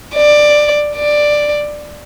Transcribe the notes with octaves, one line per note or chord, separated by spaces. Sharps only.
D5
D5